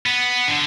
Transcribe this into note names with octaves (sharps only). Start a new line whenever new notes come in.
B3
D3